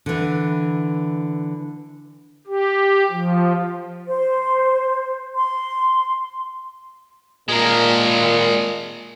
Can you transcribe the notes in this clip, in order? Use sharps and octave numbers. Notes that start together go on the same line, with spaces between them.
D3 E3
G4
F3
C5
C6
A#2 G#3 A#4